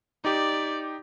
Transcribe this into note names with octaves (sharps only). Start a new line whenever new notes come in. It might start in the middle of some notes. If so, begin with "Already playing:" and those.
D#4 G4 D5